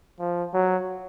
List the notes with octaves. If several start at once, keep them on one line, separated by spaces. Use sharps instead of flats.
F3
F#3